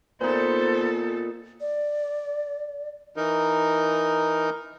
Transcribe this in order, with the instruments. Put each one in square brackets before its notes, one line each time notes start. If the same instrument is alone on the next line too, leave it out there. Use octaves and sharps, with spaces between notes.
[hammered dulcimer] A#2 D#4 [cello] B3 A4 [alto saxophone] C5
[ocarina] D5
[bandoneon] E3 D#4 A#4